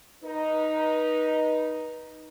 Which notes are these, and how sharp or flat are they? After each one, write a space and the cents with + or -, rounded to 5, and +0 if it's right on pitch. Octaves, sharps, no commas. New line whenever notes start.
D#4 +0 B4 -30